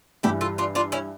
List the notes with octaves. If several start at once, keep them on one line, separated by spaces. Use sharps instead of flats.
G2 E3 G3 E4 G4
F4 A4
D4 F4
D4 F4
C#4 E4